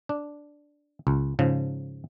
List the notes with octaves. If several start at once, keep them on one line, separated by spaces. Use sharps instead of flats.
D4
C#2
G#2 C#3 F3